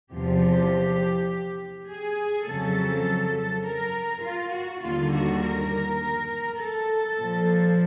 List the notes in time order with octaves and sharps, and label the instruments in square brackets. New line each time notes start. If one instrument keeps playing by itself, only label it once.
[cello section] E2 C3 F3 G4
G#4
F2 C#3 F#3 A4
A#4
F4
F#4
D#2 D3 G3 F4
F#4
A#4
A4
A#2 F3